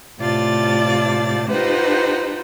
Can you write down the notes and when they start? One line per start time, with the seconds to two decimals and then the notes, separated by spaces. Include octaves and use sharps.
0.20 A2 C3 F4 D5 A5 A6
1.49 D#4 F4 G4 B4 C5 F#5